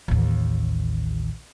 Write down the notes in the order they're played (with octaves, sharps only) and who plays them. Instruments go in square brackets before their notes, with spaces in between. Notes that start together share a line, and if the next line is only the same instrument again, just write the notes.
[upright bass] A1 D#2